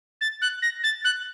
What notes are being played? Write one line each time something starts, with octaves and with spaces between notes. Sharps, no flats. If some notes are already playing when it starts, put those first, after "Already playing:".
A6
F#6
A#6
A6
F#6